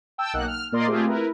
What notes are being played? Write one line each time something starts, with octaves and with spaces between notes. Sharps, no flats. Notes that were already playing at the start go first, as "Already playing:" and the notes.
G5 A5 E6
B1 A#3 D#4 F#5 F#6
F6
A#2 A#3 A#4 D5 D#5 C6
A3 C4 F4 G4 G#4
E4 A#4 B4